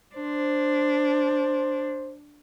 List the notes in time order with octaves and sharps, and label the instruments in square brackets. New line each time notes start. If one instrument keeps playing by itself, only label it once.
[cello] D4 [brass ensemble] C5